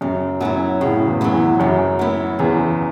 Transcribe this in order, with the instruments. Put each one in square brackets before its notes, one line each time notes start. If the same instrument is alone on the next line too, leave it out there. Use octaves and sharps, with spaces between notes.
[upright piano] F#2 [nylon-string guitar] C#3
[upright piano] F#2 [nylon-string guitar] F#3 B3 E4
[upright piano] A2 [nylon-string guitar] C#3
[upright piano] E2
[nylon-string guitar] F#3 B3 E4
[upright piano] E2
[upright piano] F#2 [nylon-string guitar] C#3
[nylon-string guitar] F#3 B3 E4
[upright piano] E2 [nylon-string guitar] C#3